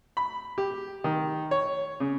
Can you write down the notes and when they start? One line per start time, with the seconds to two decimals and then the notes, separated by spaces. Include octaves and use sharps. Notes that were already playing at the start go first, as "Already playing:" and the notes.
0.17 B5
0.58 G4
1.04 D#3
1.51 C#5
2.00 C#3